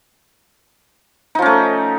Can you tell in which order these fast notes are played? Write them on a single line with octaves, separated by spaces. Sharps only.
D#4 F3 C#4 A3